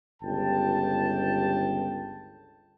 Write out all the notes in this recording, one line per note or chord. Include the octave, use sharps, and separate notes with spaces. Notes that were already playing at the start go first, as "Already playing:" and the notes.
G1 C#2 G4 G5 A5